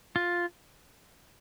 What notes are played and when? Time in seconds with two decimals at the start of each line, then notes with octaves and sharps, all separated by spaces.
0.16 F4